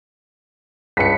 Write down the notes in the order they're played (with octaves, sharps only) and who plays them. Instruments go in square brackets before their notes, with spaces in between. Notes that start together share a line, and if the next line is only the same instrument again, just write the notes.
[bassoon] C#2 [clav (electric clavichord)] G2 B4 [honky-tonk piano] B6 C#7